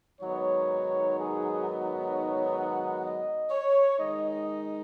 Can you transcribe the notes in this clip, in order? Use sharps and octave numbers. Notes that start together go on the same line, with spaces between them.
G#2 D#3 F#3 B3 D#4 C#5
G#4
C#5
F#5
D#5
C#5
D#3 G#3 D#4 D#5
D#5